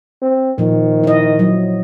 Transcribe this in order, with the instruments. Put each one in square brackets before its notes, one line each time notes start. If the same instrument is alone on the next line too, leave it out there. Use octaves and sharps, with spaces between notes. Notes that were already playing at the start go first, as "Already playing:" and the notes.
[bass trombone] C4
[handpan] A#2 F3 [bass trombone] D#3
[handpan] E4 D#5
F#3